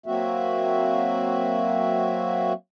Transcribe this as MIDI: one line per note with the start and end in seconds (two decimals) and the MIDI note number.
0.06 2.53 54
0.06 2.53 58
0.06 2.53 60
0.06 2.53 66
0.06 2.53 76